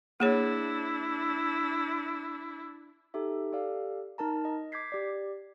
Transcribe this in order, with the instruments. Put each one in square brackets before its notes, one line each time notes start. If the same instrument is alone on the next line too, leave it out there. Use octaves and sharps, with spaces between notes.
[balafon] A#3 G#4 C#5 [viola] D4 E4
[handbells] D#4 G4 A4 E5
G4 A4 D5 F5
D#4 A#4 A5 A#5
D#5
D6 G6 G#6 B6 C7
G4 D5